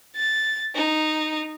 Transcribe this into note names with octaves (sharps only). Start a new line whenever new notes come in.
A6
D#4